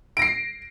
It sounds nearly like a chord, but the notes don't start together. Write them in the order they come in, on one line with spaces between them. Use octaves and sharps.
D7 A#6 C7